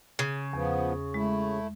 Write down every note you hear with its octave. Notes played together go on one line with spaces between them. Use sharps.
C#3
E2 F3 B3
G#3 A3 E4